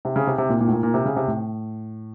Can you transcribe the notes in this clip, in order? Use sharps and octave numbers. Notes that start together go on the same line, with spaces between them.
C3
C#3
C3
C3
A#2
A#2
A2
A#2
A#2
C3
C#3
C3
A2